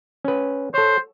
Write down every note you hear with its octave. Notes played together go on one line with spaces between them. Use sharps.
C#4 B4
A4 C5 C#5